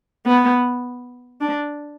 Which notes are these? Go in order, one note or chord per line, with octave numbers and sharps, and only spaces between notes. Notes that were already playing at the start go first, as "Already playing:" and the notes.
B3
D4